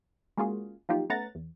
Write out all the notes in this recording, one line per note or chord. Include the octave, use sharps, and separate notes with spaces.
G#3 A#3 C#4 F4 F#4 G#4
F3 F#3 A#3 D#4 F4 G4
A3 B3 C#4 F#5 A#5 A6
E2